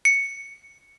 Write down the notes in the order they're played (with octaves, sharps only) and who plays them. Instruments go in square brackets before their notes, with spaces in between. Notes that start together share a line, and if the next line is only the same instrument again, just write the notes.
[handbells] C#7